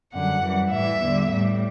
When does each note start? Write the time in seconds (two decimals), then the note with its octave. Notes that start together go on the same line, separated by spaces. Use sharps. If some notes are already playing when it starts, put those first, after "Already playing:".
0.13 F#2 D3 G3 F#5
0.43 F#2 E3 G3
0.72 A2 E3 G3 E5
1.01 E2 D3 G3
1.30 A2 G3